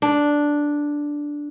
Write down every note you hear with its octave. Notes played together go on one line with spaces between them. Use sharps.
D4